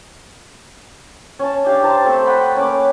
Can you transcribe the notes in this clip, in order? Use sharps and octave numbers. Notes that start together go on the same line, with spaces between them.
C#4 A5
D4 G4 F5
C5 D#5 A5 A#5
A3 C4 C5
D#5 F#5 G5 B5
A#3 C#4 B4 D6